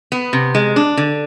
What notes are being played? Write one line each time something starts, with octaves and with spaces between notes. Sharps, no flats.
B3
C3
G#3
D4
D3